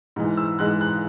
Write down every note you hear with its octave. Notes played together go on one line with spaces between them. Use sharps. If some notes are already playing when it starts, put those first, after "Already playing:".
G#2 E3 G#3
E6
G#2 E3 G#3 F#6
F#6